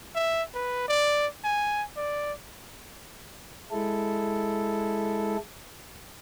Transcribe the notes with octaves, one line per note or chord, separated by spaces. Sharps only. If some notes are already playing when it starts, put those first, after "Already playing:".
E5
B4
D5
G#5
D5
G#3 E4 A4